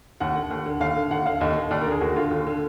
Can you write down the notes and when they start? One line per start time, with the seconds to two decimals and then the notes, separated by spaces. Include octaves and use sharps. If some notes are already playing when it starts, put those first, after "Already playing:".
0.20 D#2 F#5
0.35 D3
0.50 D#2
0.66 D3
0.80 D#2 F5
0.96 D3
1.11 D#2 F#5
1.26 D3 F5
1.40 D#2 D#5
1.56 D3
1.71 D#2 D5
1.81 A#4
1.86 D3
1.91 G#4
2.01 D#2 F#4
2.16 D3 F4
2.31 D#2
2.47 D3